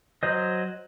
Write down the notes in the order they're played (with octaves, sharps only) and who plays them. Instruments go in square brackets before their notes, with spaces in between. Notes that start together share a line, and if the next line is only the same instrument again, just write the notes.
[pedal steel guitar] F#3 C5 D#5